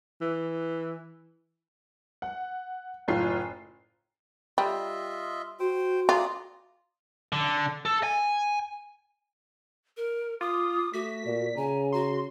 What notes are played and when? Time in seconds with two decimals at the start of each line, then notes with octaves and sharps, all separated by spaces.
0.21 E3
2.22 F#5
3.08 F#1 A2 F4 C7
4.58 G3 F4 D#5 E5
5.60 F#4 C5 G5
6.09 F4 D5 A#5 D#6
7.32 D3
7.85 A4
8.03 G#5
9.97 A#4
10.41 F4 D6 D#6
10.94 A3 F#4 B6
11.26 A#2 D5
11.57 C#3 G#5 A#5
11.92 F#4 C6